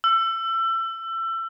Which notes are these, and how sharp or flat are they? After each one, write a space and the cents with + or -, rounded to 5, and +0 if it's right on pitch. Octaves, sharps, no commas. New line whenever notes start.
E6 +30